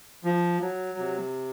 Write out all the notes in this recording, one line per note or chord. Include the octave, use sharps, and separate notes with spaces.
F3
F#3
C3